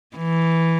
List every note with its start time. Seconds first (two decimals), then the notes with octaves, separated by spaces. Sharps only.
0.17 E3